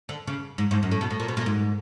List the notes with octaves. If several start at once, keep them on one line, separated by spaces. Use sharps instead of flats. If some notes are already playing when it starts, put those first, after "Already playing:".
D3
C#3
G#2
G#2
F#2
A2
B2
A2
A#2
B2
A#2
G#2